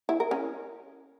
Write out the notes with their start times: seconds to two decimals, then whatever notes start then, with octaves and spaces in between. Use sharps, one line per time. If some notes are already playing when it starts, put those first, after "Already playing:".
0.09 E4
0.20 A#4
0.31 C#4